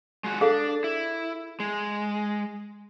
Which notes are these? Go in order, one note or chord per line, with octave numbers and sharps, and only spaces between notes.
G#3 F#4
D4 G#4 A4 F5
E4
G#3